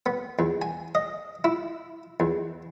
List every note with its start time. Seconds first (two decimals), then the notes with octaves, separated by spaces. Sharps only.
0.06 B3
0.39 E2
0.62 G#5
0.95 D#5
1.44 E4
2.20 E2